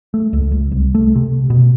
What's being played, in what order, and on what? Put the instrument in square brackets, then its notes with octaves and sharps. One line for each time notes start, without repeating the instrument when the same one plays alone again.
[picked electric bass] A3
C#2
C#2
C2
A3
C3
B2